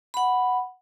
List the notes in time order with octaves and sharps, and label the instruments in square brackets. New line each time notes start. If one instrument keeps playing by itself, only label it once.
[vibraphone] F#5 B5